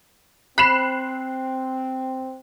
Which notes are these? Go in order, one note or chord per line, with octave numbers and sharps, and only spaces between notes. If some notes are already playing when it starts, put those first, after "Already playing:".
C4 B5 F#6 C7 E7